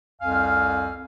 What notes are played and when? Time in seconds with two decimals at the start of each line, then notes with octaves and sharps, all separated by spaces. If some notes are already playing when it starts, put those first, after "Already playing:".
0.21 C2 F2 F5 G#5 F6